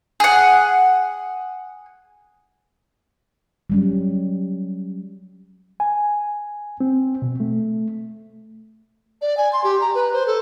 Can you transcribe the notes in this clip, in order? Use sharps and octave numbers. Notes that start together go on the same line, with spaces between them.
G#4 F#5
F#3 G3 C#4
G#5
C4
B2
A3
D5
G#5
C6
G4
A#5
B4
C5
A4